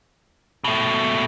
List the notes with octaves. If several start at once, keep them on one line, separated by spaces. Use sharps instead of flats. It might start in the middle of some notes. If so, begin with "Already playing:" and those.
B2 A3